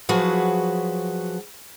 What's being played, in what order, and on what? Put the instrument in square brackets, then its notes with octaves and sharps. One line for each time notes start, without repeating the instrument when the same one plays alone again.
[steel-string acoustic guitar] F3 F#3 F#4 G#4 B4